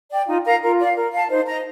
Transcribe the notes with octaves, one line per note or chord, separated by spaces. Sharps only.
D5 G5
D#4 F4
A#4 F5 A#5
F4 A#4
D5 F5
A#4
F5 A5
D#4 C5
D#5 A#5